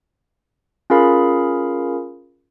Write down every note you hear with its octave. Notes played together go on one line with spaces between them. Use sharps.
C#4 F4 G#4 A#4 F5 B5